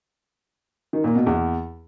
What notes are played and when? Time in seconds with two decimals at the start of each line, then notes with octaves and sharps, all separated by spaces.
0.93 D#3
1.04 A#2
1.15 B2
1.27 E2